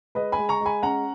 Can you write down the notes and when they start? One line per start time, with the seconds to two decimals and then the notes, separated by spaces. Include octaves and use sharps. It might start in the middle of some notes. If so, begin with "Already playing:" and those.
0.15 G#3 B4 D#5
0.32 G#5 B5
0.38 G#3
0.49 A#5 C#6
0.61 G#3 G#5 B5
0.83 C#4 F#5 A#5